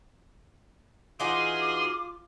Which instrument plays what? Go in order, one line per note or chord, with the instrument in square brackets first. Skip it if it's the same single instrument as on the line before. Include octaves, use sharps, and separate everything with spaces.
[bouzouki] E3 D#4 F#4 [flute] F4 [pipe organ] G#4 G#5 C6 [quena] D6